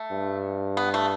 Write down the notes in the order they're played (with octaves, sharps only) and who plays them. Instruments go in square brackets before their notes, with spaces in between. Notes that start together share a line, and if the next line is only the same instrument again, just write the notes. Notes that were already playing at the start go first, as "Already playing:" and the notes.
Already playing: [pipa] A3
[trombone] G2
[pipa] B3
A3